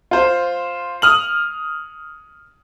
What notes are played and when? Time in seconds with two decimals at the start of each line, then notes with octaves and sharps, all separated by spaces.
0.11 F4 C5
1.02 D#6 F6 F#7